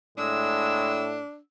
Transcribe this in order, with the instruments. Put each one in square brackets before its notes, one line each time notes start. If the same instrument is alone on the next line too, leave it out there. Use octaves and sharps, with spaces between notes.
[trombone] A2 [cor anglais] G#3 [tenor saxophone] D4 [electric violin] E6